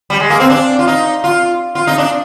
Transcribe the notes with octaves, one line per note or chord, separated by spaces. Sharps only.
G3
G#3
A#3
C4
D4
F4
D#4
F4
F4
D#4
D4